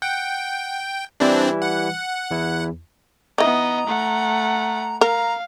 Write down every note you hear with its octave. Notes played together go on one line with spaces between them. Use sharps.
F#5 G5
E3 G3 C4 D4 E4
F#5
E2 E4
E3 B3 D#4 D#5 A#5
A3 F#5
A#4 F5 A#5